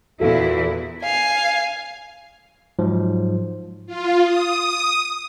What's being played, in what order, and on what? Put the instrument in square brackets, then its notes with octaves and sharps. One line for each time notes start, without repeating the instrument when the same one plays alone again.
[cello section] E2 A#2 E4 [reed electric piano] F#4 A4 F5
[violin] F5 G#5
[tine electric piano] G#2 F3 F#3
[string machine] F4
D#6